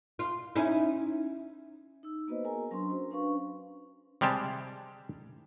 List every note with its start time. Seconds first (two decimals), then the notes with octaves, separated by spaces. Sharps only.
0.19 F4
0.56 C#4 D#4 E4
2.03 D#4 E6
2.28 A#3 B3 F#4 B4 C5 D#5
2.44 G#4 A#4 G#5 A#5
2.71 F#3 C#4 D4 C6
2.90 F#4 C5
3.11 C#4 D4 B4 F5 C#6
4.21 C3 G3 G#3 G4 A5